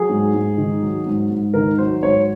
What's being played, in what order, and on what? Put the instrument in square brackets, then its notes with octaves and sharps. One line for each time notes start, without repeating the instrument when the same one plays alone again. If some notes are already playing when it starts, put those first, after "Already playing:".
Already playing: [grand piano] F#3 G#4
G#2
G#2
D#3
F#3
G#2
G#2
D#3 A#4
F#3 C5
G#2 C#5